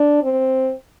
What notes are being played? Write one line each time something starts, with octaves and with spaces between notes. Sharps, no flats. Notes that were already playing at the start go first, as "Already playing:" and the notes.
Already playing: D4
C4